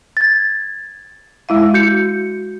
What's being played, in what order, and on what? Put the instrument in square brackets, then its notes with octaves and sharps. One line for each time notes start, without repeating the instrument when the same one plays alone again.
[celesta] G#6 A6
[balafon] G#3 E4 F5
[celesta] F#4 G6 C#7